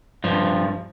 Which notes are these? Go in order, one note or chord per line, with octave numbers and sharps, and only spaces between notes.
G2 F3